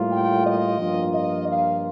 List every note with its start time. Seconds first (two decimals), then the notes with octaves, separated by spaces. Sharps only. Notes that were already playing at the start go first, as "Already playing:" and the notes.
Already playing: A2 G3 A#3 F4
0.11 G5
0.46 D#5
0.79 G2 F3 A#3 F4
1.14 D#5
1.47 F5